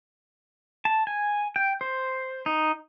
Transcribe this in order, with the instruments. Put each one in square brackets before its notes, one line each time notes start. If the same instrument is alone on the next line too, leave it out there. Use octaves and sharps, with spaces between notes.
[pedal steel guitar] A5
G#5
G5
C5
D#4